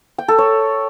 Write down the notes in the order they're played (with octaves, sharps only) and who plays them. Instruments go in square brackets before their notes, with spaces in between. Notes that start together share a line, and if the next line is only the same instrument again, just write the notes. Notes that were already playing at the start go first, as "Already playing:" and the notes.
[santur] G5
A4
C#5